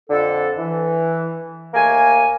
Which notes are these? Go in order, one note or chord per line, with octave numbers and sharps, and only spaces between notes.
F2 D3 A4
E3
D#2 A3 A#3 G#5